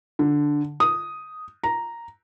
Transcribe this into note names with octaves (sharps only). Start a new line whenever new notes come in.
D3
D#6
A#5